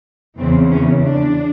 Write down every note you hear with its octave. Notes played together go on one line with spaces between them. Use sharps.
E2 C#3 E3 C4
C#4
D4